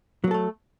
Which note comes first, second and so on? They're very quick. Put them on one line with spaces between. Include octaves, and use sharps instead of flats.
F#3 A#3 A4 A3